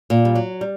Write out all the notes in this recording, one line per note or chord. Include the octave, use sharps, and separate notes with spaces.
A#2
G3
F#3
G3